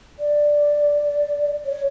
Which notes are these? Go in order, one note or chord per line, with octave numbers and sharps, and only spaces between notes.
D5
C#5